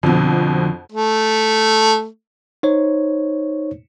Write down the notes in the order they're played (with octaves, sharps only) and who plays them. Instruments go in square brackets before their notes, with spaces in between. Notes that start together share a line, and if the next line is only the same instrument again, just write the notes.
[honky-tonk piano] F2 B2 [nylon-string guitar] D3 F3
[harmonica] A3
[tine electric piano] D#4 C5 C#5